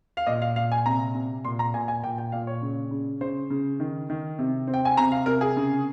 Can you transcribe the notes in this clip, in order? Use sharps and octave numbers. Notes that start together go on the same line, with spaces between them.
F5
A#2 D#5
F5
A#2 F5
G#5
C3 A#5
C3
A#2 C6
A#5
A#2 G#5
G#5
A#2 G5
G5
A#2 F5
C#5
C#3
C#3
C#3 C5
C#3
D#3
D#3
C3
C4
G5
G#5
C3 A#5
F5
C3 A#4
G#4
C#3